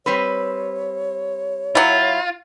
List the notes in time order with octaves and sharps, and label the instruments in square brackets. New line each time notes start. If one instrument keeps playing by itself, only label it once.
[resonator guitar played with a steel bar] G3 C4 B4 [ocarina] C#5
[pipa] F#3 E4 [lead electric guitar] F4